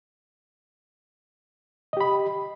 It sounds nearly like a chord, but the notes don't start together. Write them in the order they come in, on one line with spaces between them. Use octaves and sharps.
D#5 G4 B5